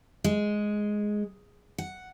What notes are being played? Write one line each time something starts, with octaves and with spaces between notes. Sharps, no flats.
G#3
F#5